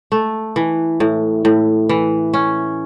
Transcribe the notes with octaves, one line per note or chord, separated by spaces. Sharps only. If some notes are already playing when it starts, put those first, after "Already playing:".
A3
E3
A2
A2
E3
C#4